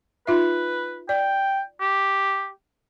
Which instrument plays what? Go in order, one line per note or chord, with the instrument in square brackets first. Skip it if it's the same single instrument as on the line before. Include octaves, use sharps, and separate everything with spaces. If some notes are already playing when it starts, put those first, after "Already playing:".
[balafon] D#4 F4 E5 [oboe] B4
[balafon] D5 [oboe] G5
[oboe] G4